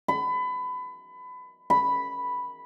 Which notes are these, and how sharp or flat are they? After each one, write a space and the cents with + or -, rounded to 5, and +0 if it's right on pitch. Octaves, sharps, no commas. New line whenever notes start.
B5 +25
B5 +0